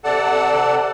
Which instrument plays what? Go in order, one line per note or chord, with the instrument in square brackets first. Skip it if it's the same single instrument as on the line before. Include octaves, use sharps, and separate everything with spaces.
[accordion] C3 A4 D5 F#5 A5